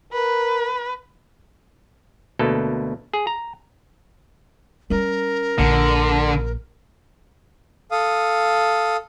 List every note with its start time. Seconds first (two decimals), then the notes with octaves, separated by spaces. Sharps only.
0.13 A#4 B4
2.39 D2 B2 A#3 A4
3.13 G#4
3.27 A#5
4.90 G3 C#4 A#4
5.59 A#1 D3
7.91 A4 F5 D#6